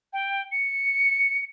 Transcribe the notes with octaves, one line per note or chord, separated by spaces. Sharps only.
G5
C#7